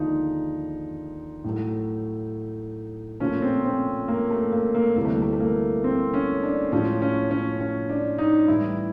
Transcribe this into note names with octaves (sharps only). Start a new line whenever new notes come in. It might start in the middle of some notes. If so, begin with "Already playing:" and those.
Already playing: D#2 D3 F3 G#3 D#4
A2 F#3 A3
A#2 F3 A3 C#4
C4
C4
A#3
A3
A#3
A#3
D2 C3 E3 G3 A#3
A3
A3
A3
A#3
C4
C#4
D4
A2 F3 G#3 C#4
C#4
C#4
C#4
D4
D#4
A2 E3 G3 E4